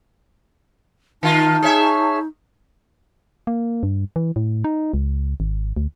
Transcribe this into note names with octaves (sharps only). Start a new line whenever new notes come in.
D#3 D#4 F4 A5
G#4 C#5 E5
A#3
G2
E3
A2
D#4
C#2
G#1
D2